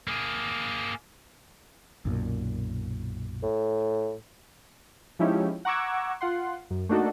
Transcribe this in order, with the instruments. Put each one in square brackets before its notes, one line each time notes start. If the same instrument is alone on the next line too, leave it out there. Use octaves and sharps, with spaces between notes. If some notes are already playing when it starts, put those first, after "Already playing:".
[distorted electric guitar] A#3 G#4
[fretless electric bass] B1 F#2 A#2
[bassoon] A2
[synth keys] F3 G#3 C#4 D#4 E4 G4
F#5 A#5 C#6 D6 E6 G#6
F4 F#5 C6
F#2
A3 A#3 D4 D#4 F#4 A4